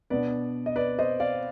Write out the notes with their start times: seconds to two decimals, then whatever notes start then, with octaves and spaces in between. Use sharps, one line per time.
0.10 B2 B3 D4 B4 D5
0.66 D#5
0.76 B4 D5
0.99 C5 D#5
1.20 D5 F5